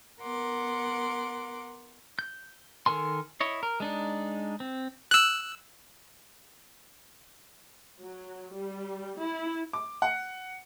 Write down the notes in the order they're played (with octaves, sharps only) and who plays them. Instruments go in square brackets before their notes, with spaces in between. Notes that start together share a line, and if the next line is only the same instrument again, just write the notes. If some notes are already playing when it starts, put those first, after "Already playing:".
[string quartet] B3 A#4 F#5 C6 D6
[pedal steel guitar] G6
D#3 A4 A#4 G#5 C6
E4 C#5 D#5
A#4
G#3 D4 D#4
C4
[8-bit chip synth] E6 F#6
[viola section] F#3
G3
E4
[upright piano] D6
F#5